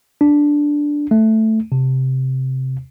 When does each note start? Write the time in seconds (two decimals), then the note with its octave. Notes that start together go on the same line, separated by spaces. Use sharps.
0.21 D4
1.11 A3
1.72 C3